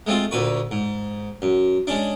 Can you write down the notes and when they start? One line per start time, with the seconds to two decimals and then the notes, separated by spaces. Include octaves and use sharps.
0.07 G#3 A3 C4 F4
0.31 D2 A#2 B4 C#6
0.71 G#2
1.42 F#2
1.87 G#3 C#4 D4